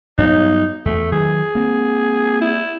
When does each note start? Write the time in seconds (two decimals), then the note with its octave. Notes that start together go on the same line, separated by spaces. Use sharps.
0.18 G2 F#3 B3 D#4
0.86 E2 A3
1.12 D#3 F#3 G#4
1.55 A#3 C4
2.41 E4